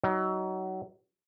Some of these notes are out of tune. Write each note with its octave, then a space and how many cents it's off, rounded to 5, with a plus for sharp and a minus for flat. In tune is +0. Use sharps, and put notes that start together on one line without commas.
F#3 +25 D#4 +20